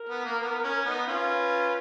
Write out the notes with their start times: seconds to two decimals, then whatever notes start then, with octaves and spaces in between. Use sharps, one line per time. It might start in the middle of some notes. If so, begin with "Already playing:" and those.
Already playing: A#4
0.09 B3
0.25 A#3
0.42 B3
0.64 C#4
0.85 B3 D#4
1.06 C#4 F4 B4